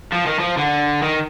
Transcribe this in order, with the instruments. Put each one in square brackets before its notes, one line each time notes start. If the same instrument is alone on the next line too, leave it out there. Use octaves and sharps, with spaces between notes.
[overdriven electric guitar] F3
D#3
F3
D3
D#3